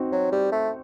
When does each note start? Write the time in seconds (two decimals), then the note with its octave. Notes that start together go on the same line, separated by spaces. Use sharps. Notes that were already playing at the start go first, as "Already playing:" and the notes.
Already playing: C4 D#4 F#4
0.12 F#3
0.32 G3
0.52 A3